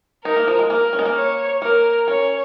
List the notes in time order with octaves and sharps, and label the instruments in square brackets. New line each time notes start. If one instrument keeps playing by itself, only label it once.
[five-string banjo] D#4 [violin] A#4
[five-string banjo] A#3
F3
G#3
[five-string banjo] A#3 [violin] A#4
[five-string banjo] C#4
G#3
A#3
[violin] C#5
[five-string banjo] A#3 [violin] A#4
[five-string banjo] C#4 [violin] C#5